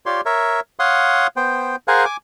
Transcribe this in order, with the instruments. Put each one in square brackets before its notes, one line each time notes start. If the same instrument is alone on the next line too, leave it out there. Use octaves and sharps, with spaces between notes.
[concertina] F4 G4 C#5 D5 C6
A#4 C#5 E5
C#5 F5 F#5 C6 D#6
B3 C5 G5
G#4 A#4 C5 F5 F#5 G#5
G#5 D6